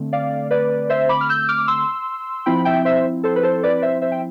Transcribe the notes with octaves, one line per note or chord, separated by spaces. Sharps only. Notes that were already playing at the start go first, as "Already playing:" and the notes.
Already playing: D3 A3 C4
D5 F5
B4 D5
C5 E5
B5 D6
F6
E6 G6
D6 F6
C6 E6
F3 C4 E4 G5 B5
E5 G5
C5 E5
A4 C5
B4
A4 C5
B4 D5
C5 E5
C5 E5
G5